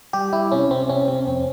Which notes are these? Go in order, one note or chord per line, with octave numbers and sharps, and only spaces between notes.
G3 G4
G3 E4
C3 C#4
C3 C4
C3 C#4
C3 C4
F2 C4